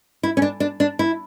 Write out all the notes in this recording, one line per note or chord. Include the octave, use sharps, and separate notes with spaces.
E4
C#4
D4
D4
D4
E4